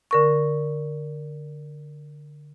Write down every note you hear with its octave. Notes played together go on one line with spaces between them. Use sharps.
D3 A#4 C#6